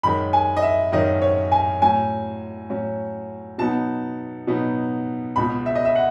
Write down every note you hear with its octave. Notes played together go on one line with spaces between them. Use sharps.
F#2 D#3 G#3 C#4 B5
G#5
D#5
E5
F#2 D#3 G#3 C#4 D#5
C#5
G#5
A2 F#3 C#4 G#5
A2 F#3 C#4
B2 F#3 B3 D#4 A5
B2 F#3 B3 D#4
C#2 B2 G#3 B5
E5
D#5
E5
F#5